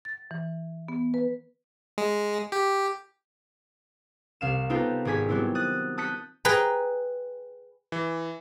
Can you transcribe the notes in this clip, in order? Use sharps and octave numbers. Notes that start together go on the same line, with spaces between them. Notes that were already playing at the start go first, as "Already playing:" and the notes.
A6
E3
B3
B4
G#3
G4
C2 F5 E7
B3 D#4 F4 G4 A4 B4
G#1 G4 G#4 G#5 B6
F#3 G3 B3 C4 E4
D#6 F#6 A6
A5 D#6 F#6 G6 B6 C#7
G#4 B4 G5 A#5
E3